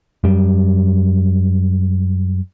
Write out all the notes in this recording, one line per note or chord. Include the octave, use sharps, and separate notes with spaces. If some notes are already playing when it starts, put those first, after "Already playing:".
F#2 G3